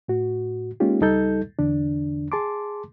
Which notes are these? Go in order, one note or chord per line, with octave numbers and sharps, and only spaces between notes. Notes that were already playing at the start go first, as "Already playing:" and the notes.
A2 F#4
G#3 A#3 C#4 D#4 F4 G4
C#2 G3 D#4 A4 G6
E2 D3 D4
G#4 A5 C6 D6